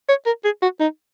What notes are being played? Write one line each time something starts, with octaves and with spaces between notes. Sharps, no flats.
C#5
A#4
G#4
F#4
D#4